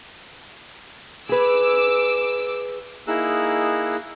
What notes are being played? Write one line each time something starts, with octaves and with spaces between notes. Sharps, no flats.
G#4 B4 D6 E6
A#3 D#4 E4 G#4 E6 F#6